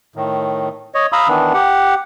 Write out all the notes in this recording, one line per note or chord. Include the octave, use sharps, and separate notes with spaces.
A2 D#3
C#5 D#5
F5 A#5 B5 D#6 E6
D#3 E3 B3 D4
G4 F#5